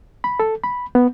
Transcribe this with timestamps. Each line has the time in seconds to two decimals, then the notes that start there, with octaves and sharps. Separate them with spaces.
0.24 B5
0.40 A4
0.64 B5
0.95 B3